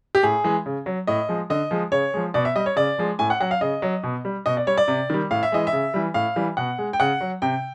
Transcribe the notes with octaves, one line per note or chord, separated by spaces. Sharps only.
G4
A2 G#4
E3 G#3
C#3
F#3
A2 D#5
F3 G#3
D3 D#5
F3 G#3
C#3 C#5
F3 G#3
B2 D5
E5
G3 D#5
C#5
C#3 D5
F3 G#3
A2 G#5
F#5
F#3 F#5
F5
C#3 D#5
F#3
B2
G3
B2 D#5
D5
G3 C#5
D5
C3
D#3 G3
A2 F5
E5
E3 G#3 D#5
E5
C#3
E3 G3
A2 F5
E3 G3
B2 F#5
G#3
G5
C#3 F#5
F#3
C3 G5